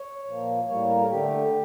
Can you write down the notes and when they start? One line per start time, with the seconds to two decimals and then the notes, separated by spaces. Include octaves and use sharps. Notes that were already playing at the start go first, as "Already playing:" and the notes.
Already playing: C#5
0.27 A#2 F3 A#3
0.68 A2 G3 A#3 C#5
0.89 A#4
1.10 D3 A3 G4